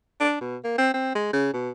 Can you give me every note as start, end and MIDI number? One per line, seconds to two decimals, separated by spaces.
0.20 0.38 62
0.41 0.56 47
0.64 0.76 58
0.78 0.91 60
0.94 1.11 60
1.15 1.32 56
1.33 1.53 49
1.53 1.70 47